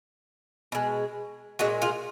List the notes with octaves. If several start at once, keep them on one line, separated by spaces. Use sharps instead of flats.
B2 G#3
A#2 G#3 D#4 F#4
F4 G#4